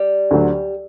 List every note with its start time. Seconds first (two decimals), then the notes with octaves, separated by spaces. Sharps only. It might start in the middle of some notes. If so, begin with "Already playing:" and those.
Already playing: G3
0.31 D2 D3 F#3